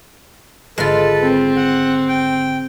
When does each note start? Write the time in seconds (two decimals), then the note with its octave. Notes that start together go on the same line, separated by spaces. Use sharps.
0.78 G#1 D3 G#3 F4 A4 B4 A6
1.22 C4
1.56 F#5
2.08 G5